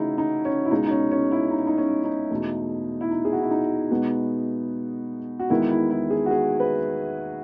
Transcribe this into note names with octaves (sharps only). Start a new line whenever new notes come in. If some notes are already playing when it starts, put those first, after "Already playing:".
Already playing: C#3 E3 A3 D#4 E4 F#4 G#4
D#4
C#4
E4
C#2 B2 G#3 D#4
D#4
C#4
C#4
E4
D#4
D#4
C#4
D#4
E2 B2 A3
E4
D#4
G#4
F#4
E4
D#4
B2 G#3 B3
F#4
E2 D#3 G#3 B3 E4
E4
E4
G#4
F#4
G#4
B4